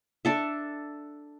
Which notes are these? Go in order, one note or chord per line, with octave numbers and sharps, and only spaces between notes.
D4 A4 E5